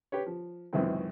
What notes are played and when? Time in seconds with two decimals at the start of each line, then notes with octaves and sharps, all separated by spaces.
0.12 G4 B4 C#5
0.26 F3
0.73 C#2 F#2 C3 D#3 E3 C4